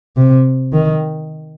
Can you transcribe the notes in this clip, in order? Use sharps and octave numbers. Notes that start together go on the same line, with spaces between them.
C3
D#3